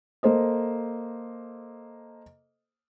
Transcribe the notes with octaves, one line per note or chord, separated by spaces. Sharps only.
A#3 A4 C5 D#5